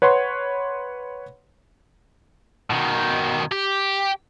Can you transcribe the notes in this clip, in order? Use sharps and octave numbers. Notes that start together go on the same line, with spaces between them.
B4 C#5 F#5 C6
B2 D#3
G4